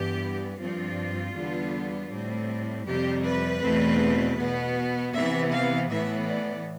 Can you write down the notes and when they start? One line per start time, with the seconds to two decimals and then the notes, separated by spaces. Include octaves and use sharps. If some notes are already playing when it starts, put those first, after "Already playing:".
Already playing: G2 E3 B3 G4
0.58 G2 F3 C4 F4
1.34 E2 D3 G3 B3
2.10 A2 G3 C4
2.86 F2 C3 G3 G4
3.24 B4
3.62 E2 B2 A3 C4
4.38 B2 B3
5.13 C3 E3 B3 E5
5.52 F5
5.89 A2 E3 B3 E5
6.27 D5